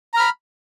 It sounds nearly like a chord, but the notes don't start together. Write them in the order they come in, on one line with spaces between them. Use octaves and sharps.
A#5 F6 B5